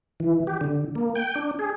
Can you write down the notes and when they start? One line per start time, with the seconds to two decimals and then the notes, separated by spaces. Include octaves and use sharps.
0.20 E3
0.47 G4
0.61 D3
0.95 A#3
1.15 G5
1.35 D4
1.59 G#4